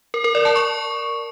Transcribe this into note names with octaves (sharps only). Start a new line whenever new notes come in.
A#4
A#4
D5
A5
C#6